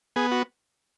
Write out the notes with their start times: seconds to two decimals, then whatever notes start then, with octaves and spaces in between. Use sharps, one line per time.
0.16 B3 G#4
0.32 F#4